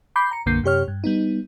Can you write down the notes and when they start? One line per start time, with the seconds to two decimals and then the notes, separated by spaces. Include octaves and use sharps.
0.16 B5 D6 G6 C7
0.31 A#5 C#7
0.46 B1 F#2 D3 A#3 G6 C7
0.63 F#2 C3 G4 C#5 F6
0.88 G2
1.04 G3 B3 D#4